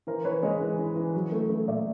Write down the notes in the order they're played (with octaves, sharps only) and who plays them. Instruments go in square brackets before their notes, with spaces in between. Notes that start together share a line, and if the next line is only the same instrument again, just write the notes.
[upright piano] E3 A#4 C5
E3 B4 C#5
G#3 C#5 D#5
E3
E3
E3
F#3
A3
A3
A#2 D5 E5